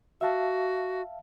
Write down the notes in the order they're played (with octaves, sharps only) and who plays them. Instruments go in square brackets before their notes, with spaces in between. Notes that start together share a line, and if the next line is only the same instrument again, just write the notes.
[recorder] F#4 [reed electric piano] E5 F5 A5